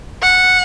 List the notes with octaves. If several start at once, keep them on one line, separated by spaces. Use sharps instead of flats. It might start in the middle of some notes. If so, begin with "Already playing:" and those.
F#5